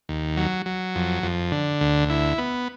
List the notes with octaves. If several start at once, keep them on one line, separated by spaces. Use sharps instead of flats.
D#2
F#3
F#3
F2
F2
D3
D2
E4
B3